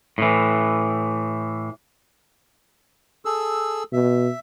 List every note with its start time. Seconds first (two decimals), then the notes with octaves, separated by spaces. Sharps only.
0.18 A2 E3
3.25 G#4 A4 E6
3.93 B2 E5